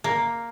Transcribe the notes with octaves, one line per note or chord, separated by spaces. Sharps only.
A#3